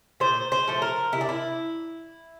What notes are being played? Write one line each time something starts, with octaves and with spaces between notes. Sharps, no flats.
A#2 C5
C5
F3 A3
A#4
C3 E4
D4
E4